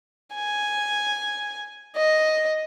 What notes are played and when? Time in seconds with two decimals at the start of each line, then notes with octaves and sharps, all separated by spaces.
0.35 G#5
1.96 D#5